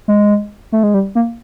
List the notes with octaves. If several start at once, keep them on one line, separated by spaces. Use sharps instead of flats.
G#3
A3
G#3
G3
A#3